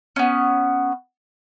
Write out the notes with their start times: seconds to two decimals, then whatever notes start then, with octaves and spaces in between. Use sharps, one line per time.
0.16 B3 C#4